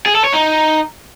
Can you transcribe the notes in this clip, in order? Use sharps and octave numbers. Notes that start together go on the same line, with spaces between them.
G#4
A4
C#5
D#4